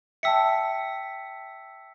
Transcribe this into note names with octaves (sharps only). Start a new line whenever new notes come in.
E5 G5 A5 E6 B6 C#7